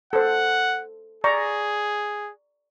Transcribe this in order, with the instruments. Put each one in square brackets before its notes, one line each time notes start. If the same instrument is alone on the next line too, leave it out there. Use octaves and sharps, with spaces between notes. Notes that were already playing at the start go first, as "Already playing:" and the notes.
[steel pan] A4 C5 [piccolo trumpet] F#5
[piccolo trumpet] G#4 [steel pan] D5 A#5 C#6